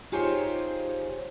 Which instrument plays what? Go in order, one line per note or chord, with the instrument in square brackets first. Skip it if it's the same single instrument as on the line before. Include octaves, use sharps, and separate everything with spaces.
[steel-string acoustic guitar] D#4 F4 G4 G#4 C5 C#5